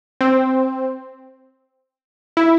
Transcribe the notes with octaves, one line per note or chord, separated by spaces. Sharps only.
C4
E4